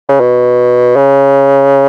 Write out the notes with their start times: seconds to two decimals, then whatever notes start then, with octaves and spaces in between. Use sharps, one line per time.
0.09 C#3
0.20 B2
0.96 C#3